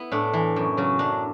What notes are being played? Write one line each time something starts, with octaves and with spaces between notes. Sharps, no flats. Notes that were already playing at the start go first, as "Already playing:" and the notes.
Already playing: B3 E4
A2 D4
E3
F#2
C#3 F#3
F#2 D4